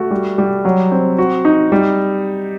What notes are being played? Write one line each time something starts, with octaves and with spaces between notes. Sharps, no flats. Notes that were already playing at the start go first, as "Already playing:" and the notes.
Already playing: A3 F#4
G3
G3
F#3
C4
F#4
D#4
G3